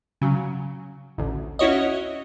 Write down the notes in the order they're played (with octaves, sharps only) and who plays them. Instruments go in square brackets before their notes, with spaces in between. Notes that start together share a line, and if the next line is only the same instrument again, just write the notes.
[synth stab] C#3 F#3
A1 D2
C#4 E4 F#4 C#5 D#5